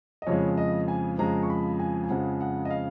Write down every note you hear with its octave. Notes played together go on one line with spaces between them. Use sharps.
D#5
F2 C#3 F3 G#3 C#5
D#5
G#5
F2 C#3 F3 G#3 A#5
C#6
B5
G#5
G#5
F2 C#3 F3 G#3 F#5
F#5
D#5
F5